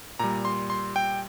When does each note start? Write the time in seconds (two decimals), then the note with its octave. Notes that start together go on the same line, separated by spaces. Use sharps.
0.19 A#2 G3 A#5
0.45 C6
0.70 C6
0.96 G5